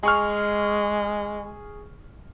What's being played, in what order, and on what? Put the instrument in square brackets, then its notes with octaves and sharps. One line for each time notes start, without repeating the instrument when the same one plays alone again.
[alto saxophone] G#3 [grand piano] G#4 C#6 F6